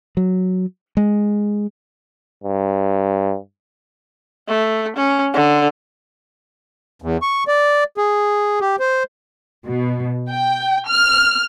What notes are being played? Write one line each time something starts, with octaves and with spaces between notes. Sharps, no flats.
F#3
G#3
G2
A3
C#4
D3
E2
C#6
D5
G#4
G4
C5
B2
G5
F6